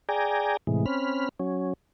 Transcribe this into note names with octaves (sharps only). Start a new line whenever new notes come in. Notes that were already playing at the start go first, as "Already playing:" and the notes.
G#4 D5 G5 G#5 A#5
A2 C3 E3 G#3
C4 C#4 B5 F6
F#3 C#4